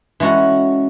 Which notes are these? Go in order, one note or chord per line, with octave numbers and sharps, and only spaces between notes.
E3 G#3 C#4 F#4 A4